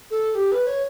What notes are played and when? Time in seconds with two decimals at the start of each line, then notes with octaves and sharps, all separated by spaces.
0.11 A4
0.31 A4
0.35 G4
0.52 B4
0.67 C#5